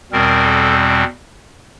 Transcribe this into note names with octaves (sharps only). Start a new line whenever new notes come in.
E2 B2 G3 C4 A#4
A4